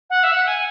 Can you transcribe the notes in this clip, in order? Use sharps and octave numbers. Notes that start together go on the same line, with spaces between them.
F#5
E5
F#5
G#5